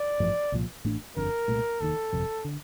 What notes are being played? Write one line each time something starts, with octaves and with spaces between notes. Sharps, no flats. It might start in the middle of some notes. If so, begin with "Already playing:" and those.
Already playing: D5
A1 G2 F3 A3
C2 A#2 F3
A1 A2 A3 D4
G1 F2 D3 A#4
C2 A#2 A3
F1 D#2 D#3 A4
G1 F2 C3 F3
D3